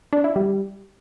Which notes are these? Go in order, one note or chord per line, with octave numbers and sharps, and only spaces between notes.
D4
E4
G3